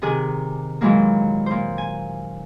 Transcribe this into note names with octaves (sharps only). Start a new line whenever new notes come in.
C3 D#3 G#4 G#5 F#6
A#2 D#3 E3 F#3 G#3 A#3
A#2 C5
G#5